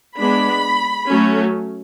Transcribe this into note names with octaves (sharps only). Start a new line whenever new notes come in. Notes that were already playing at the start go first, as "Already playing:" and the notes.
G#3 B3 D4 B5
F#3 A3 C#4